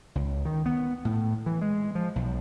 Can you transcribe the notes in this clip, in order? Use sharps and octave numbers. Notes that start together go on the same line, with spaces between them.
C#2
D#3
B3
A2
E3
G#3
F3
B1